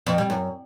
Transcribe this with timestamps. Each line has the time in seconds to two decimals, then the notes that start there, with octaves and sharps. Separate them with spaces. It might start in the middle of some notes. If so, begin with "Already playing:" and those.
0.07 F2
0.18 G3
0.30 F#2